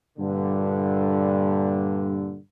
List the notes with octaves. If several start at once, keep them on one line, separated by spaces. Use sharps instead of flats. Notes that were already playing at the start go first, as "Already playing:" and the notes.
G2 A#2 D3